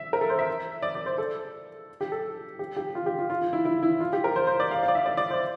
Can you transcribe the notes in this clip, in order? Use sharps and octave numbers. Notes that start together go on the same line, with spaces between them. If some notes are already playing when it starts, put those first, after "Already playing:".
Already playing: E5
A#4
A4
C5
E5
D5
D5
C5
A4
G4
A4
G4
G4
F4
G4
F4
F4
F4
E4
E4
E4
F4
G4
A#4
C5
C5
D5
F5
F5
D5
E5
D5
D5
C5